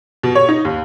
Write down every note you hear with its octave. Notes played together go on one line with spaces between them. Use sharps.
B2
C#5
D#4
D#2